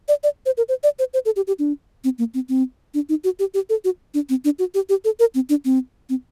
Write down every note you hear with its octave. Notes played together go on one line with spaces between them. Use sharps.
D5
D5
C5
A#4
C5
D5
C5
C5
A4
G4
G4
D4
C4
A#3
C4
C4
D4
D#4
F#4
G4
G4
A4
F#4
D4
C4
D4
F#4
G4
G4
A4
A#4
C4
D4
C4
C4